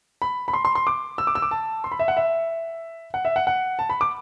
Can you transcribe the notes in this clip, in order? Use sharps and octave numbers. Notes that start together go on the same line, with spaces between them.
B5
B5
C6
C6
C6
D6
E6
D6
E6
D6
A5
C6
B5
E5
F#5
E5
F#5
E5
F#5
F#5
A5
B5
D6